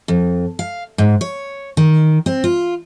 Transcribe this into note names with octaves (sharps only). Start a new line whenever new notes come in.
F2
F5
G#2
C#5
D#3
C4
F4